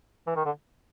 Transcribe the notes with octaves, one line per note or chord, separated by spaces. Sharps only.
E3
D#3
D3